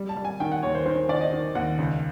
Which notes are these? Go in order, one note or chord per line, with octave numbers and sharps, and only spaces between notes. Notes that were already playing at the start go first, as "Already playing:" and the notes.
Already playing: G3
A5
G3
G#5
D#3 G5
F#5
D#2 C#5
C5
D#3 C5
D#3 D5
D#5
D#3
D#2 F#5
C#2